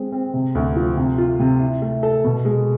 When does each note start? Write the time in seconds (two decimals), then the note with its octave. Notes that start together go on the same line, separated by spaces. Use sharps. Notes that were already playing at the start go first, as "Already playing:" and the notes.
Already playing: G#3 C4
0.12 C4
0.34 C3
0.55 D2
0.76 F3
0.97 C3
1.18 F4
1.39 C3
1.60 E4
1.82 A3
2.03 A4
2.24 B2
2.45 G#3